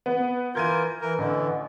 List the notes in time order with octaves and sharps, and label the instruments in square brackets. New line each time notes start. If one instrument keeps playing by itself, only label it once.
[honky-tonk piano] B3
[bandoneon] E3 F4 A#4 [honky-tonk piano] G6 G#6 D#7
[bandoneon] E3 A#4
[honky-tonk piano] A1 [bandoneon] D3 E3